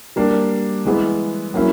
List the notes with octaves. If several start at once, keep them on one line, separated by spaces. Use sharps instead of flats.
G3 A#3 D4
E3 G#3 B3
F#3 A#3 C#4 E4